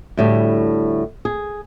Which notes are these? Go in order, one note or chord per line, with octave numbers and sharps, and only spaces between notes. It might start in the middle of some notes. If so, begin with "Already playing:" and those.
D2 A2 G3
G#4